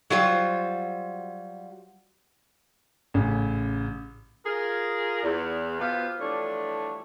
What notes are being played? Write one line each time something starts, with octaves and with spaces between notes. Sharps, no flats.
F#3 G3 F4 C5
A1 C#3
F4 G#4 A#4
E2
B2 B3 F4 G4 C5 F5
E3 F3 G3 A3 D4 C#5